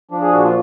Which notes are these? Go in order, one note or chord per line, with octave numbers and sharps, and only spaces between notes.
F3 D4
G#4
A#2 F#4
F4